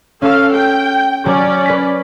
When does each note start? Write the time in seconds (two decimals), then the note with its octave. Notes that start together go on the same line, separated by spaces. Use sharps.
0.22 C#4 A4 F5 E6
0.53 G5
1.26 F#3 C#4 D5
1.66 B4 B6